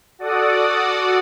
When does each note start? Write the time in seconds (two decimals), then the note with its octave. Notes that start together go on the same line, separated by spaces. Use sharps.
0.19 F#4 A4 D5 F#5 D#6